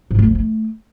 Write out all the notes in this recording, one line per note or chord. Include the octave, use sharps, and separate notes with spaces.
G#2
A3
F3
A3